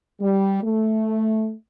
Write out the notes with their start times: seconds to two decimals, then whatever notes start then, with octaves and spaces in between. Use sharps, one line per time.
0.20 G3
0.63 A3